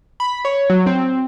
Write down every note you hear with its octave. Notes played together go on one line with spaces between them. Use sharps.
B5
C#5
F#3
C4